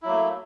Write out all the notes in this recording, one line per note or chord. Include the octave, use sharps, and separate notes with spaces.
F#3 A3 A#3 E4